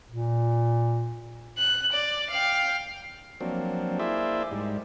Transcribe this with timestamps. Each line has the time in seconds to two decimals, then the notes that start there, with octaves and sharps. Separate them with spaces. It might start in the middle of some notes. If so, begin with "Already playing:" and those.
0.11 A#2
1.59 F#6
1.93 D5
2.32 F5 G5
3.41 F3 F#3 A#3 C4 D4
3.99 A#3 E4 G#4 C5 D5 E5
4.51 G#2 G3